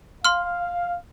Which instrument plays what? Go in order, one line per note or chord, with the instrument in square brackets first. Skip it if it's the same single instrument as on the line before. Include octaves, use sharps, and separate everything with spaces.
[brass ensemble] F5 [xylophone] C6 F6